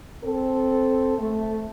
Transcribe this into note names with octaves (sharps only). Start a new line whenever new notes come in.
C4 A4
A3